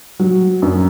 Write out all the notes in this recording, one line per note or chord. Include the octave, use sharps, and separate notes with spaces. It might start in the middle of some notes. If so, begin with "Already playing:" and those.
F#3
F#2